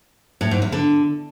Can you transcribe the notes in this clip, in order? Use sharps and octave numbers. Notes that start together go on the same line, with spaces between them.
A2
G#2
E2
D3